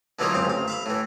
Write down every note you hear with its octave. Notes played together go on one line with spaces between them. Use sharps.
D3 E3 F#3 A#3 D#4 F4
C#2 F#2 C4 F5
A1 F5
E5 F5 B5
A2 E3